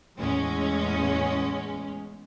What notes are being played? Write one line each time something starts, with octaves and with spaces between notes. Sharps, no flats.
E2 A2 G#3 C#4